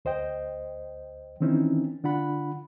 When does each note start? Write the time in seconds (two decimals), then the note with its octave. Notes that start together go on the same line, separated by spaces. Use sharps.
0.05 D2 C5 D#5 G5
1.40 D#3 E3 C4 C#4 D#4 E4
2.04 D3 D4 F4 F#5 B5